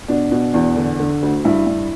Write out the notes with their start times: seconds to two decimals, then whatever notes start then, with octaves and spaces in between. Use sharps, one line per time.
0.08 B2 D4
0.32 B2
0.54 E2
0.77 D3
0.99 D3
1.22 D2
1.45 G2 E4
1.67 G2